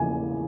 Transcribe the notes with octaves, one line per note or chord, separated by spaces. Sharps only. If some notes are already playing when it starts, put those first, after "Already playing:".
Already playing: E2 C#3 F3 A#3 G#5